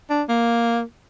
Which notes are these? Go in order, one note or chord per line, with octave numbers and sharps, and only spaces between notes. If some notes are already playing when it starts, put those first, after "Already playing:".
D4
A#3